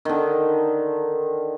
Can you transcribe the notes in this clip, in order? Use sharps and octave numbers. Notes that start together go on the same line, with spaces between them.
D3 D#3